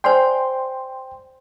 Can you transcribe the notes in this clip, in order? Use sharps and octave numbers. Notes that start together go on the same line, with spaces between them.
C5 D5 G5 G#5 C6